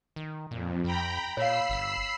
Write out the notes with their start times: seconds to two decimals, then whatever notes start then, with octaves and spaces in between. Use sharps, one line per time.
0.16 D#3
0.51 F2 A#2
0.84 F2 G5 A#5 B5
1.37 A#2 C#5 F5 B5 E6 C7
1.70 G1